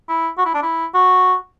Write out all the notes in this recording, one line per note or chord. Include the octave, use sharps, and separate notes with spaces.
E4
F#4
E4
D4
E4
F#4